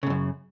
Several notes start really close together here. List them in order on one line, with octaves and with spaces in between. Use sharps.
C#3 A2 F#2